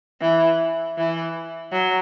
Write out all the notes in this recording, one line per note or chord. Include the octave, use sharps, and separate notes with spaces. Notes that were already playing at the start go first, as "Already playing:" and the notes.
E3
E3
F#3